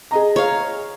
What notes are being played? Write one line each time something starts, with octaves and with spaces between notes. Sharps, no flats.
G#4 D#5 A#5
C#5 F5